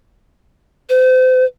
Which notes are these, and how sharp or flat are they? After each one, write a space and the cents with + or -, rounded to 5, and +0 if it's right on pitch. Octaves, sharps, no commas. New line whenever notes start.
C5 -35